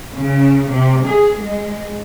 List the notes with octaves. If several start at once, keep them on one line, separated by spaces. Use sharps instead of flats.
C#3
C3
G#4
G#3